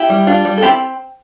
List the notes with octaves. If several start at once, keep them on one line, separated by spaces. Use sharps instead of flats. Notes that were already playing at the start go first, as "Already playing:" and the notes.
Already playing: E4 G4
G3
D4 F4
G3
A4
C4 E4 G4